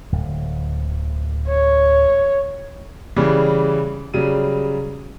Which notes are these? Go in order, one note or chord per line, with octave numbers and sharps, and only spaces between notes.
D1
C#5
C#3 E3 G3
C#3 F#3 G3 D#7